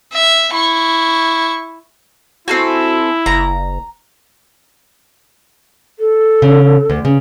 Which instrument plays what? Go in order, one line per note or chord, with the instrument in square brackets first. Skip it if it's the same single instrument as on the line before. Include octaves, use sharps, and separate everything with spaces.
[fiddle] E5
E4 C#6
[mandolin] C4 A4 G#5 [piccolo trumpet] E4 [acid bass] F#4
[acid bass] F#1 [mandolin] A#5
[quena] A4
[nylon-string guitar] C#3
D2
C#3